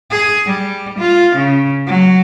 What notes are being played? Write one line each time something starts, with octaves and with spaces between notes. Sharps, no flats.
G#4
G3
F4
C#3
F#3